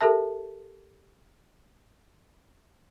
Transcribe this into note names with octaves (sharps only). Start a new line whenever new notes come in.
G4 A4 A#4 E5 A5